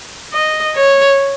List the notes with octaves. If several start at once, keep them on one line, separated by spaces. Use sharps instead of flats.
D#5
C#5